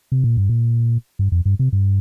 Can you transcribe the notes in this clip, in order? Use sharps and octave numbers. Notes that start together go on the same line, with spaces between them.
C3
A#2
G2
A#2
G2
F2
G2
C3
G2